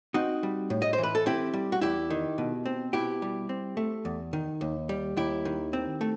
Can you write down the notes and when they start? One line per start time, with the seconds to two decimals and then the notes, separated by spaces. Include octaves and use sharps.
0.14 C4 D#4 F#4
0.43 G3
0.70 A2
0.82 D#5
0.93 C5
0.98 E3
1.03 B4
1.15 A4
1.26 C4 E4 G4
1.54 G3
1.72 F#4
1.81 E2 E4 G4
2.10 D#3
2.38 B2
2.66 C4
2.93 B2 E4 G4
3.22 G3
3.49 C4
3.77 A3
4.05 E2
4.33 D#3
4.61 D#2
4.89 G3
5.17 D#2 E4 G4
5.45 D#3
5.73 C4
6.01 A3